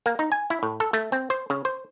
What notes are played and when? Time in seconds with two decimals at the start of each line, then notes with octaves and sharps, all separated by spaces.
0.06 A#3
0.19 D#4
0.32 G#5
0.50 E4
0.63 A2
0.80 A4
0.93 A3
1.12 C4
1.30 C5
1.50 C#3
1.65 C5